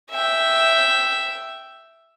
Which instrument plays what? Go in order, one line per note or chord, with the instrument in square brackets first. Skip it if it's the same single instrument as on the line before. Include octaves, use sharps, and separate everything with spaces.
[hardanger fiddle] E5 G5